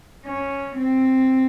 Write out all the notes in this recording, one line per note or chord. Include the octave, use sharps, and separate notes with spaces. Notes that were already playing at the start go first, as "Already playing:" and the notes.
C#4
C4